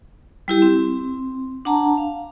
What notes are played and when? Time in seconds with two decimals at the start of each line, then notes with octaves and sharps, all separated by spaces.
0.48 G3 E4 G4
0.62 C4
1.65 D4 F#5 A5 A#5
1.97 F5